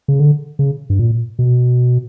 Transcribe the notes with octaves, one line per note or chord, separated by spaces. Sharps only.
C#3
D3
C#3
G2
A#2
B2